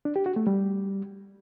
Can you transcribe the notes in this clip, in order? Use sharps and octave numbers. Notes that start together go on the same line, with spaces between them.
D4
G4
F#4
A3
G3